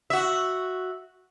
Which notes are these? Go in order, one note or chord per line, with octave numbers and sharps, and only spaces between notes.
F#4 E5